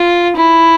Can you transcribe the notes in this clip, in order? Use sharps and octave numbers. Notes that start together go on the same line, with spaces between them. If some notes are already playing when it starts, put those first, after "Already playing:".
Already playing: F4
E4